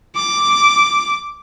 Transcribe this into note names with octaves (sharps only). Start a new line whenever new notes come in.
D6